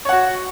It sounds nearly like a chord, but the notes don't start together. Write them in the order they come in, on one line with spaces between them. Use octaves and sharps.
C#5 F#5 F#4